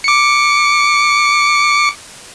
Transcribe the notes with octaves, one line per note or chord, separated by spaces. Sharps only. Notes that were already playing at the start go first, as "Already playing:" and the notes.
D6 C#7